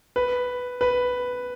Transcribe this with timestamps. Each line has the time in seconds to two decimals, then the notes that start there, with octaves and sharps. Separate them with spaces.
0.16 B4
0.81 B4